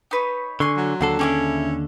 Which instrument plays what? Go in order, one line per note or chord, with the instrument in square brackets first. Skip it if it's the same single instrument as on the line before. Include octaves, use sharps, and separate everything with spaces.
[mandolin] D#4 B4 C#5
[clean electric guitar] D3 [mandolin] G#5 C6 C#6
[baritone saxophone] F#3
[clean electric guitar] D#2 D3 A4 [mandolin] F#5 C6
[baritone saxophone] C#4 [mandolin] E4 G4 G#4